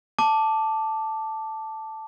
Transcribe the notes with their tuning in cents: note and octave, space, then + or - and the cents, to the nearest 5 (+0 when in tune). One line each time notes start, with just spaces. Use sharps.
A5 +0 D6 +0